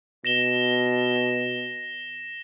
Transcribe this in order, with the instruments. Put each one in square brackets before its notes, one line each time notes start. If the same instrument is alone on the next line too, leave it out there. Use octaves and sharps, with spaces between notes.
[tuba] B2 [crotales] A#6 E7 G7